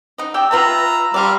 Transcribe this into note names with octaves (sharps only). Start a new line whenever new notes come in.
D#4 D#5
G4 D5 G5 E6
F4 B4 E5 A#5
G3 D5 F5 C6